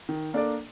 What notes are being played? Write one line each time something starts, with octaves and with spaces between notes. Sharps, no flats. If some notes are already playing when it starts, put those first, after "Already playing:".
D#3
A#3 D4 A4 D5